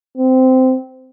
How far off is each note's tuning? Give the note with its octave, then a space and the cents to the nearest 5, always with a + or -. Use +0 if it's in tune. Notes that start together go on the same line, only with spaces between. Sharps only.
C4 -15